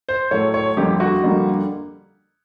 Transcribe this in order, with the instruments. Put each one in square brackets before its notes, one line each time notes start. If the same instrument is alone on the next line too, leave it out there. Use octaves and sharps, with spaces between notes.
[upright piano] C5
A2 F#3 A3 C#5
C#5
F2 D3 G3 A#3 G4
F#4
F2 D3 G3 A#3